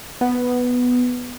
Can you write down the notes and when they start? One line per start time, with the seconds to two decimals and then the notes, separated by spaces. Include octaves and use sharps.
0.21 B3